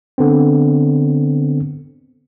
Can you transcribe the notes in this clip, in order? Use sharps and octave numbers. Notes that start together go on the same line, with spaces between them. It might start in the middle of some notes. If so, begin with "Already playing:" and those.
D3 B3 C4